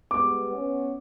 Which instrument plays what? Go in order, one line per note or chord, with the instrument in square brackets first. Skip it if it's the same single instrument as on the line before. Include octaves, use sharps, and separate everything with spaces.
[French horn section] G3 G#3 B3 [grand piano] D6
[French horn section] B3 C#4